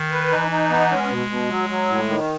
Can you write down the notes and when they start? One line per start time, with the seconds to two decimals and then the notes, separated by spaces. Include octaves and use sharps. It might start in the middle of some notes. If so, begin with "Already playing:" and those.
Already playing: D#3
0.11 B4
0.31 E3 D#4
0.51 D#4
0.70 B3
0.91 G#3 C#4
1.10 B2
1.30 B2
1.50 F#3
1.70 F#3
1.89 A2
2.09 D#3